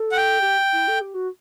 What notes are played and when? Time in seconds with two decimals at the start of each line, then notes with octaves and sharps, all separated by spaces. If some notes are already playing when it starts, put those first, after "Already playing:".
Already playing: A4
0.12 F#5
0.17 G5
0.40 G4
0.72 E4
0.87 A4
1.00 G4
1.14 F#4